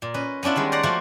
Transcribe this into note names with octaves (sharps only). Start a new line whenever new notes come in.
A#2
C#4 B4 D#5
B3 C#4 D4 E4 F4
D#3 G3 G#3
C5 D5 F#5 A#5
F3 A3 A#3 F4 F#4 C5